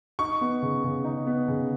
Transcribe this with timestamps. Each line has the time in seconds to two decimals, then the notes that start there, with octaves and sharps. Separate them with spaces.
0.19 D#4 C#6
0.41 B3
0.62 C#3
0.84 C#3
1.04 D#4
1.27 B3
1.48 C#3